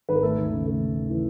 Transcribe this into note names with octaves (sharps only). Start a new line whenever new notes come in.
G#1 B4
A#4
A3 A4
D#2
C#3
A3
D#2
D#2
E3